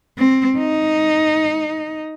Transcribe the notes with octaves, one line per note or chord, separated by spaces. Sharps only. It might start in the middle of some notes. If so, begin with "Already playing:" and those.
C4
D#4